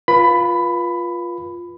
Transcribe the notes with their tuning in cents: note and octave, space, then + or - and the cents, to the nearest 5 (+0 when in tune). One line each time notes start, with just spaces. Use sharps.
F4 +0 B4 -35 B5 +15